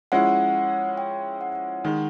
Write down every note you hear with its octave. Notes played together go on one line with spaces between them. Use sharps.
F3 G#3 C#4 E4 F#5
G5
F#5
D#3 G#3